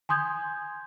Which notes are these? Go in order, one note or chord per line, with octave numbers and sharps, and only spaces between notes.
G#5 C6 D#6 G6 G#6